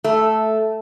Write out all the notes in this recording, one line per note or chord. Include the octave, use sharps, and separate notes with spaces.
A3